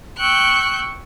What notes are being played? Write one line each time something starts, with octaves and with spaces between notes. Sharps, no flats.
G5 C#6 E6 F#6 G6